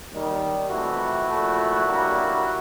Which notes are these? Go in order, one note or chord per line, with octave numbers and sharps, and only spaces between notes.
D#2 D#3 G3
F2 C3 E3 A3 E4 F#4
A#2 F3 A3
F#2 D3 G3 A#3